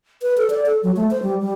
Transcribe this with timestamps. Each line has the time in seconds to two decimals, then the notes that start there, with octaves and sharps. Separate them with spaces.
0.22 B4
0.37 A4
0.50 D5
0.66 A4
0.83 F#3
0.96 A3
1.11 C5
1.23 G3
1.41 G3